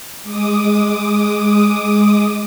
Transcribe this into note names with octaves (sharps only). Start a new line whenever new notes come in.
G#3 D6 D#6